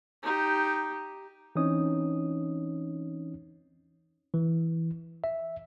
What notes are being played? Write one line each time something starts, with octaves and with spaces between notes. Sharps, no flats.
D#4 G4
E3 C4 C#4 D#4 C#5 D#6
E3
E5